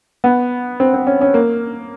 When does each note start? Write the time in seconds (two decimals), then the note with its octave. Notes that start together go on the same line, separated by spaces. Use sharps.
0.24 B3
0.80 C4
0.94 C4
1.07 C#4
1.21 C#4
1.34 A#3